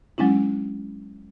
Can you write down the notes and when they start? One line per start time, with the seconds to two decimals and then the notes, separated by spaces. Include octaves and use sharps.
0.18 F#3 G#3 C#4 D4 E4